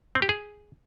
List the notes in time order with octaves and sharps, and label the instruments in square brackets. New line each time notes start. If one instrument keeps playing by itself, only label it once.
[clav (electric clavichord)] C4
G4
G#4